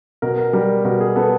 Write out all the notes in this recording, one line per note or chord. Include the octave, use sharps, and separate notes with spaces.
B2 A#4
A#4
G3 A#4
B2 A#4
G#4
B3 A4